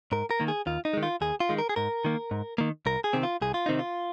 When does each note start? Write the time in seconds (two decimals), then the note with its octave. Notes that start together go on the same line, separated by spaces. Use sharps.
0.12 G#2 A#4
0.31 A#4
0.40 D#3 A#3
0.48 G#4
0.67 D#2 F4
0.85 D#4
0.93 D#3 G#3
1.03 F4
1.21 D#2 G#4
1.40 F4
1.49 D#3 G#3
1.59 A#4
1.69 G#4
1.76 G#2 A#4
2.05 D#3 A#3
2.31 G#2
2.58 D#3 A#3
2.86 C2 A#4
3.04 G#4
3.13 C3 D#3 C4
3.23 F4
3.41 C2 G#4
3.54 F4
3.66 C3 D#3 C4 D#4
3.79 F4